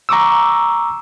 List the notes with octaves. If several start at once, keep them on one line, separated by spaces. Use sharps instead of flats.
A#5 C#6 D6 E6